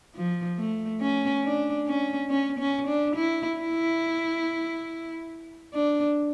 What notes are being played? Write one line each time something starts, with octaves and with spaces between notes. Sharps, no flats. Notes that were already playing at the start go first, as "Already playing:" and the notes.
F3
A3
C#4
D4
C#4
C#4
C#4
D4
E4
E4
D4